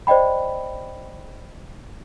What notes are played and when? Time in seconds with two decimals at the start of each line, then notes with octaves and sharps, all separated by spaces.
0.07 C5 D5 D#5 G5 B5